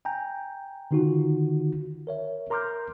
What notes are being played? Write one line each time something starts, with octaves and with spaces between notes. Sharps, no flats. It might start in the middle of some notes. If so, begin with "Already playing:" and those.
G5 G#5 A#5 G6
D3 D#3 D#4 F4 F#4
A#4 C#5 E5
A#4 A#5 C6 D6 F6 G6